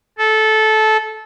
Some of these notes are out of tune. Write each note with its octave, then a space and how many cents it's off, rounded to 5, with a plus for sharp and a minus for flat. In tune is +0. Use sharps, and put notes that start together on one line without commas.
A4 -15